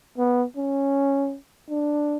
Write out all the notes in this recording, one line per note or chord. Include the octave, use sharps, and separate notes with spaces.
B3
C#4
D4